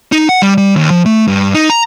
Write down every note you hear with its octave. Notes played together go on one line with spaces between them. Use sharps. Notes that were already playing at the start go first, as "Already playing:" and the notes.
D#4
F#5
G3
G3
D#2
F3
A3
G2
D#4
A#5